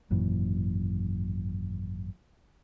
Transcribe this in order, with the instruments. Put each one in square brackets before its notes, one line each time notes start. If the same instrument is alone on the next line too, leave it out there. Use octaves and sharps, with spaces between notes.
[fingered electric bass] G#1 F#2 A#2 E3